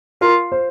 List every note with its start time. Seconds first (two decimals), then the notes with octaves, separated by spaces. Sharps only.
0.21 F4 A#4
0.52 C5